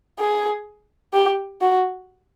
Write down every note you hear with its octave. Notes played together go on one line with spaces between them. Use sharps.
G#4
G4
F#4